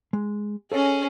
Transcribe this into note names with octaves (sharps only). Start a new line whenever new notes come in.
G#3
C#4 G#4 A4 C#5 D#5